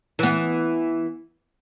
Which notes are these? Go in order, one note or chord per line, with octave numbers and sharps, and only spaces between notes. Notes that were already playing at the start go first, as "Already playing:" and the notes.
E3 B3